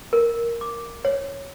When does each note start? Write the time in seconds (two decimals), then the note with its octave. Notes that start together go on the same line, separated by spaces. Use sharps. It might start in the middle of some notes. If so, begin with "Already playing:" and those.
0.13 A#4
0.61 D6
1.05 C#5